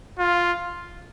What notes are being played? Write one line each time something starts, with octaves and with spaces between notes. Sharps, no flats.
F4